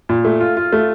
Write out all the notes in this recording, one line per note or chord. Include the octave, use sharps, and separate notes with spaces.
A#2
A3
F4
F4
A3